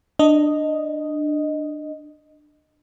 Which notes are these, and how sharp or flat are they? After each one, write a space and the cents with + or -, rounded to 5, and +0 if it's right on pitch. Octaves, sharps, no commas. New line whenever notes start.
D4 +20 D#5 +0